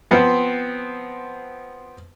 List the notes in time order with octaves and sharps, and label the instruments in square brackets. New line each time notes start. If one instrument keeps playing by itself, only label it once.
[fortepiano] F3 B3 C4 B4 C5